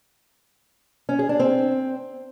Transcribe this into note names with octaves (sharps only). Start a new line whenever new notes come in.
C#4
G#4
D4
C4